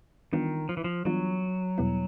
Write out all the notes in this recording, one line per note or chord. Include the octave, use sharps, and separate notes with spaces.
D#3 E3 G3 B3 D4 F4
F3
E3
F3
E3 F#3 G3 B3 D4 F4
E2 B2 G3 B3 E4